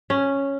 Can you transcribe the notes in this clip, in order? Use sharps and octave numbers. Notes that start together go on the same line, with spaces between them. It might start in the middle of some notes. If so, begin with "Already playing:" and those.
C#4